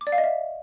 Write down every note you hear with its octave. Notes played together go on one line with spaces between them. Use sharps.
D6
D5
F5
D#5
E5